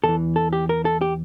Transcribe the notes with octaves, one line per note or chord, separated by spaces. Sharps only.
E2 E3 A4
A4
G4
A#4
A4
G4